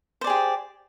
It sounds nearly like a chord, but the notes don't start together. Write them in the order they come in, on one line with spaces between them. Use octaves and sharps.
C5 D5 G#4 G4